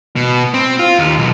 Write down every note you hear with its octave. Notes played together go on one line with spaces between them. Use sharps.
B2
C4
F4
D#2
B1